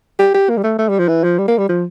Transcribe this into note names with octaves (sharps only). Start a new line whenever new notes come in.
G4
G4
A#3
G3
A3
A3
G3
F3
E3
F3
G3
A#3
G3
F3